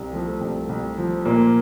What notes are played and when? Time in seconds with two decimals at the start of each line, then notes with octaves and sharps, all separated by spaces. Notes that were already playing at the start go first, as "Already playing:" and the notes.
Already playing: C2
0.13 F3 A3
0.41 C2
0.69 C2
0.98 F3
1.25 A#2 A#3